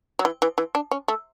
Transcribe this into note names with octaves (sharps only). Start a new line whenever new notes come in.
F#3
E3
E3
E3
D4
C#4
A3